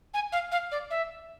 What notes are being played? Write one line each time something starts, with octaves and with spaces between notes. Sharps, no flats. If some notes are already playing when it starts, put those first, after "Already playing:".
G#5
F5
F5
D5
E5